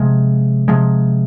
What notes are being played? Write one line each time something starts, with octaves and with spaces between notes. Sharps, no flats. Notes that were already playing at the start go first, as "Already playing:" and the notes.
Already playing: C3 F3 G#3
C3 F3 G#3